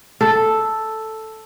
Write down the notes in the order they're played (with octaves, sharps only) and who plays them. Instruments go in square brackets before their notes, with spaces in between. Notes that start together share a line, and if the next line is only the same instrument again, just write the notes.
[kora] A4